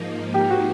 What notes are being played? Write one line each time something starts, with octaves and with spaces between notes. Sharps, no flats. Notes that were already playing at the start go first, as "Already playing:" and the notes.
Already playing: G#2 F3 A#3 D#4
G4
F#4